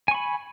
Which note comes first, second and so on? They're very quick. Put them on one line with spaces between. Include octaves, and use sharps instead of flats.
G#5 C#6 B5